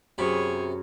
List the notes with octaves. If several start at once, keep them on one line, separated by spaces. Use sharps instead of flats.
F#2 C3 F#4 G#4 C#5 B5